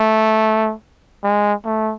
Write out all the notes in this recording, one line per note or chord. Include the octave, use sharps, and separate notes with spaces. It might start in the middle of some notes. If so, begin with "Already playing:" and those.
Already playing: A3
G#3
A3